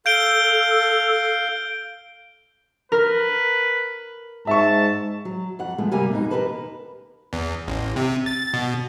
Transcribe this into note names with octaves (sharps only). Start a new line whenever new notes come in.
A4 F5 G6 D7 G7
A#4 B4
G#2 E5 A5 C#6
F#3
F2 F#5
F3 G#3 A3 B3
G2 C3 G3 A#3 G#5
F2 B2 D#4
D#2 B2 G4 A#4 B4 A5
E2
A1
C3
A6
B2